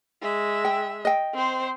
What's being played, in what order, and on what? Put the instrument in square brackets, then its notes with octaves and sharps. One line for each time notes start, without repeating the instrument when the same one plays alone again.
[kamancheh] G#3 E5
[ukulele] G5
D#5 G5
[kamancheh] C4 C5